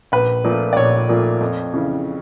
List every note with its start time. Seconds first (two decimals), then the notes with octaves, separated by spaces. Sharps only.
0.12 A#1 B4
0.44 A#2 F3 A3
0.73 D5
0.76 A#1 C#5
1.09 A#2 F3 A3
1.41 F2
1.74 C#3 E3